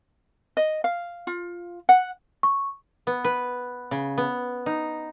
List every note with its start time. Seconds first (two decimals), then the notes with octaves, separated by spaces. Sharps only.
0.57 D#5
0.84 F5
1.27 F4
1.89 F#5
2.43 C#6
3.07 B3
3.24 B4
3.91 C#3
4.18 B3
4.66 D#4